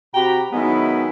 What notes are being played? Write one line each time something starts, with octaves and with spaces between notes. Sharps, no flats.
C3 F#4 G4 G5 A#5 B5
D#3 F#3 G#3 B3 C#4 E4